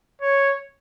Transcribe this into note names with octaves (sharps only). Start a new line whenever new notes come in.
C#5